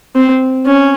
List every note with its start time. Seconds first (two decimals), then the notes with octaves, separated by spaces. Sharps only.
0.16 C4
0.66 C#4